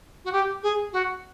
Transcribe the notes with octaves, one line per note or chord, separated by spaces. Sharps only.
F#4
G4
G#4
F#4